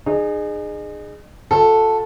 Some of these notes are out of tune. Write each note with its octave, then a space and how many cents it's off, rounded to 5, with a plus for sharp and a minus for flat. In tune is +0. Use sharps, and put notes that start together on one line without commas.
D#4 -40 G#4 +0
F#4 -45 A4 +0